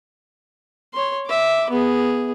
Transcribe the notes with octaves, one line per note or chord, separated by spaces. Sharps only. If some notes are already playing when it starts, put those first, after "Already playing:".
C#5 C6
E5 D6
B3 G#4